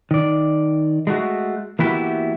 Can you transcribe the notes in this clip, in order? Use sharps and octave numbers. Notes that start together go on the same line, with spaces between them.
D#3 D5
G#3 A3 F#4
E3 A#3 B3 E4 F#4 G4